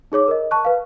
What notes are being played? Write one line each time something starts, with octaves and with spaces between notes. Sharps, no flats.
D#4 G#4 C#5 D6
A#4 D#5
A5 C#6 F#6
B4 F5